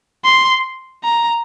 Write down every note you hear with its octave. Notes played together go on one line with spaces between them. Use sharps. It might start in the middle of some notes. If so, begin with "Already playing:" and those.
C6
A#5